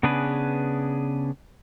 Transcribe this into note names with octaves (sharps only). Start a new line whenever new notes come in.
C#3 B3 D4 G#4 B4